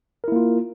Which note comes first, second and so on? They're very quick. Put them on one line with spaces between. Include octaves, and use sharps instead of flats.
A#4 E4 A#3 F4